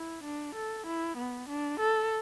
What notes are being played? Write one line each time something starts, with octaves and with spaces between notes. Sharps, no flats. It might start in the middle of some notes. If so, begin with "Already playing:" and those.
Already playing: E4
D4
A4
E4
B3
D4
A4